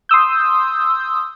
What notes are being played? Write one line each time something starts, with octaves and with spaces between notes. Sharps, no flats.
C6 D#6 E6 G6